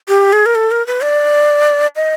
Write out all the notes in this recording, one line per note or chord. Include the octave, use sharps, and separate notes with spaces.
G4
G#4
A#4
A4
A#4
B4
D5
D#5